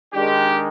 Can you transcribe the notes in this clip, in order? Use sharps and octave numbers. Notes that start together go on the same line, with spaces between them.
D#3 G#3 D4 G4